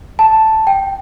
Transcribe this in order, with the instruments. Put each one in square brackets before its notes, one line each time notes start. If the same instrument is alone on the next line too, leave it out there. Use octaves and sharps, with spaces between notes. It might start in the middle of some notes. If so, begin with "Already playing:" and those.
[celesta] A5
G5